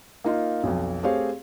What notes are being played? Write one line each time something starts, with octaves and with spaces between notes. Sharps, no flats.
A#3 D#4 F4
B1 F2
A3 C4 G4 G#4 C#5 F5